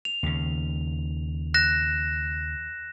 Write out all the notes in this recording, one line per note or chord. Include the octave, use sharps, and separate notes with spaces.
F7
D#2 C#3
F#6 A#6 E7